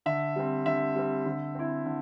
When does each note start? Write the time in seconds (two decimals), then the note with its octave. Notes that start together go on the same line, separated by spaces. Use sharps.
0.06 D3 E5
0.36 G3 C4
0.66 D3 E5
0.95 G3 C4
1.26 D3
1.55 C4 E4
1.86 D3